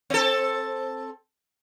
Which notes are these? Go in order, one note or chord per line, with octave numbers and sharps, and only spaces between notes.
C4 A4